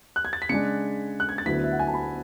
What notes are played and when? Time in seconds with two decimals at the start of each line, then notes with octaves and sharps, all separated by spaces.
0.16 F#6
0.25 G#6
0.33 A6
0.42 B6
0.49 C#3 G#3 D4 C#7
1.20 F#6
1.29 G#6
1.38 A6
1.46 D2 D3 F#3 B3 E4 B6
1.64 E5
1.71 F#5
1.79 G#5
1.87 A5
1.94 B5